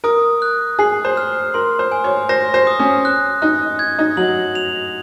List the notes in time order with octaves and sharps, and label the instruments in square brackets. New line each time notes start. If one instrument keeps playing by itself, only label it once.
[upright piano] A#4 [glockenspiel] D#6
[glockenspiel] F#6
[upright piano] G#4 [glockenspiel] C7
[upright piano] C5
[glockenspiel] F6
[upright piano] A#4 [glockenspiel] C6
[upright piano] C5
[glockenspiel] G#5
[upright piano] C#5
[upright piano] C5 [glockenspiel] A#6
[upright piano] C5
[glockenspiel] D#6
[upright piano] C#4
[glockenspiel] F#6
[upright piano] D#4 [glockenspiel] F#6
[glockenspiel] G#6
[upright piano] D#4
[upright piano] F#3 [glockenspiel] F#7
[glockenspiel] F7